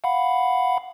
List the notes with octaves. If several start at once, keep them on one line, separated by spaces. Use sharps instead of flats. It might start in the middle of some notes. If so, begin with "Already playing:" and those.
F5 F#5 B5